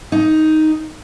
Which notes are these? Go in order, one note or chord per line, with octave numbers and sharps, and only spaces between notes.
D#4